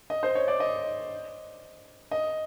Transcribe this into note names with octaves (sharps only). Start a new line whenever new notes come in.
D#5
C5
C#5
D5
D#5
D#5